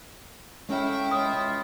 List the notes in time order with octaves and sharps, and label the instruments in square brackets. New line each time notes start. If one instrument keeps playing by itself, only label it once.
[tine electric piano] G#3 C#4 [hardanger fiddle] E4 G5 [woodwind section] A4 C#5 F5
[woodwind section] C#2 F4 [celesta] D#6